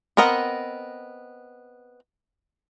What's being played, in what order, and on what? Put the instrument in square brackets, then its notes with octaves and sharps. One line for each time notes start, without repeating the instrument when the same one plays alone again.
[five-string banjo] B3 C4 A#4 D#5 F#5